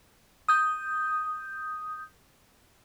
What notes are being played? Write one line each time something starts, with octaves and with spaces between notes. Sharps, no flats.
D#6 G6